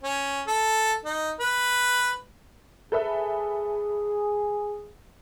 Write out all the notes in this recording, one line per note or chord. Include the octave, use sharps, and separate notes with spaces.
C#4
A4
D#4
B4
G#4 A4 B4 E5